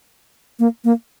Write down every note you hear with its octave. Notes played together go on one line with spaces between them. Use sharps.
A#3
A#3